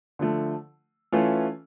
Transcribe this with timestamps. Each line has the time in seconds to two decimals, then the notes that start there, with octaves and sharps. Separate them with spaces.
0.19 D3 F3 A3
1.12 E3 A3 C#4 F4